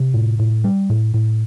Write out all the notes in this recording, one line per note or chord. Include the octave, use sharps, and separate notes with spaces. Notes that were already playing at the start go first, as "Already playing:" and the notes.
Already playing: C3
A2
A2
G3
A2
A2